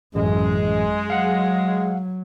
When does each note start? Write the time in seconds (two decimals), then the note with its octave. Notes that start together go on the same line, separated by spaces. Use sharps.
0.15 A1 F#2 G#3
1.10 F#3 F5 F#5